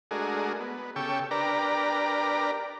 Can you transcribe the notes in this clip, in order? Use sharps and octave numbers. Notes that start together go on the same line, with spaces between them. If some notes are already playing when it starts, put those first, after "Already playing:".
G#3 A3 D4 F#4 G#4 A#4
B3
C#3 G4 A4 G5 C#6 E6
D4 G4 A#4 B4 D5 A#5